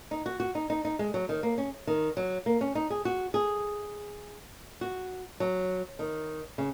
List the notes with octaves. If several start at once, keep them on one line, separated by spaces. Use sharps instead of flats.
D#4
F#4
F#4
D#4
D#4
D#4
G#3
F#3
D#3
A#3
C#4
D#3
F#3
A#3
C#4
D#4
G#4
F#4
G#4
F#4
F#3
D#3
C#3